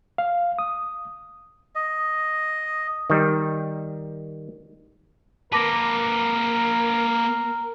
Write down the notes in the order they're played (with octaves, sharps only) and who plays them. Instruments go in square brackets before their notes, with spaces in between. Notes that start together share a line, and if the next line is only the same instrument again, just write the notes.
[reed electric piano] F5
D#6
[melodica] D#5
[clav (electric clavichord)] D#3 G3
[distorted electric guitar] A#3 B4 [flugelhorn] A#4 [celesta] A5 D6 A#6